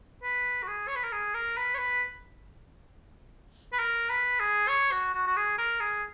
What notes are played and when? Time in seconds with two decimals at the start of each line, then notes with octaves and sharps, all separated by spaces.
0.23 B4
0.63 F#4
0.68 G#4
0.88 C#5
0.96 B4
1.04 A#4
1.13 G#4
1.35 A#4
1.57 B4
1.75 C#5
1.78 B4
3.73 B4
3.79 A#4
4.10 B4
4.40 G#4
4.69 C#5
4.92 F#4
5.14 F#4
5.27 F#4
5.37 G#4
5.58 A#4
5.80 G#4